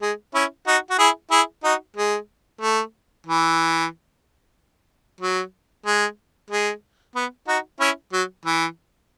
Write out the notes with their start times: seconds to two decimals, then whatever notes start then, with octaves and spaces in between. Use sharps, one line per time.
0.02 G#3
0.34 C#4 E4
0.67 D#4 F#4
0.90 F#4
0.98 E4 G#4
1.31 E4 G#4
1.64 D#4 F#4
1.96 G#3
2.61 A3
3.27 E3
5.21 F#3
5.86 G#3
6.50 G#3
7.15 B3
7.48 D#4 F#4
7.80 C#4 E4
8.13 F#3
8.45 E3